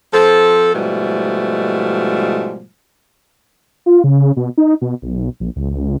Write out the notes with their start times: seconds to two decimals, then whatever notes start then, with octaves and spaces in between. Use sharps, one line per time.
0.13 F3 C4 A4
0.74 G#2 B2 F3 G3 A3
3.86 F4
4.04 C#3
4.37 B2
4.58 D#4
4.82 B2
5.02 B1
5.40 A#1
5.56 C#2
5.70 C#2